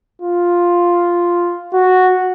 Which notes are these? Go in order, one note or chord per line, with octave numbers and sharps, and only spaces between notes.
F4
F#4